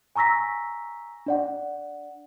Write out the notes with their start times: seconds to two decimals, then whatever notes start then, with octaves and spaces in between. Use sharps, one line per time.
0.16 G#5 A#5 C#6 E6 A#6 B6
1.26 D4 D5 F#5